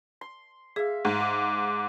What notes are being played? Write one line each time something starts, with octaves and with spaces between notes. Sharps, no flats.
C6
G#4 E5 F5
G#2
D6